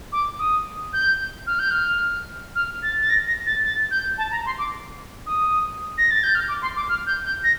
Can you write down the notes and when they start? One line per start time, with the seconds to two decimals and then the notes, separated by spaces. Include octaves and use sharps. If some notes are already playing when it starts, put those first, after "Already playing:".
0.12 D6
0.39 D#6
0.93 G6
1.46 F6
1.59 G6
1.71 F6
2.55 F6
2.82 A6
3.00 A6
3.09 A#6
3.27 A#6
3.46 A6
3.64 A6
3.91 G6
4.17 A5
4.31 A#5
4.46 C6
4.58 D6
5.26 D#6
5.97 A#6
6.10 A6
6.23 G6
6.35 F6
6.48 D6
6.62 C6
6.76 D6
6.89 F6
7.06 G6
7.25 G6
7.43 A#6